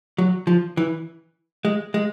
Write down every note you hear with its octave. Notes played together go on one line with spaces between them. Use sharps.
F#3
F3
E3
G#3
G#3